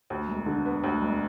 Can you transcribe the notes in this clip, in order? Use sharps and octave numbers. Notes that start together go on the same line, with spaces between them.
D2
E1
D3
B3
D2
E1